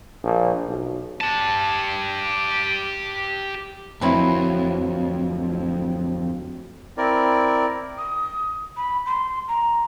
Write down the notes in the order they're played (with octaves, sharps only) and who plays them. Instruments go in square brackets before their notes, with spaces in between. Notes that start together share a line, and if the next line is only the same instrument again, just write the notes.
[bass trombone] A#1
B1
[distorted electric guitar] G4 A5
[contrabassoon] D1 [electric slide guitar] F2 [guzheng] F#3 C4 B4 [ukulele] E4 C#5 B5
[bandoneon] C4 E4 A#4 D5
[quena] D#6
B5
C6
A#5